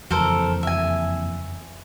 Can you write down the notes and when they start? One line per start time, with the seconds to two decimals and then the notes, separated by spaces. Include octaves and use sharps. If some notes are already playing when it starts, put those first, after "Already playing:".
0.10 F#1 F2 E3 A4 A#4 C5
0.63 E5 G#5